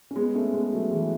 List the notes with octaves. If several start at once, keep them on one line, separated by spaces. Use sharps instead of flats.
C#4
G#3 B3
A3 C#4
G#3 B3
F#3 A3
E3 G#3